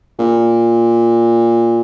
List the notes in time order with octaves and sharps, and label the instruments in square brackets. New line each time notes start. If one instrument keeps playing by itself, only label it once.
[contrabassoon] A#2